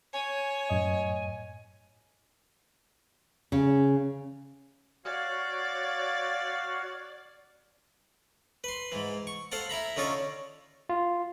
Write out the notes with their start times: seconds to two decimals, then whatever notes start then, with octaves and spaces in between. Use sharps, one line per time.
0.13 C#5 G#5
0.70 F#2 A2 D#5
3.52 C#3
5.05 F#4 C#5 D5 F5
8.64 B4 C6
8.92 G#2 E3
9.27 C#6
9.52 A4 C5 F5 F#5 A5
9.69 E4 E5 A#5 B5
9.97 D3 C#4 D#4 F4 A4 C#5
10.89 F4